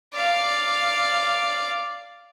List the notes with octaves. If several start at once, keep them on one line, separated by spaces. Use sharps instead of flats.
D5 F5